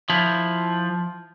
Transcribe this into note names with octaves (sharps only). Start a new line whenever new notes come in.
F3 E4